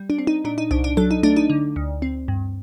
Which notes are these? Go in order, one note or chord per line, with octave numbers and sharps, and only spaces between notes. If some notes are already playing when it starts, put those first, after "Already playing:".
Already playing: G3
D4
C4
D#4
A#2 D4
D#4
C2 D4
D4
F#3 A4
D#4
A3 D4
D#4
D3
D2
C4
G2